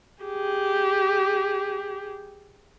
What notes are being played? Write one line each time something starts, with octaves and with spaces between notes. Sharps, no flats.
G4 G#4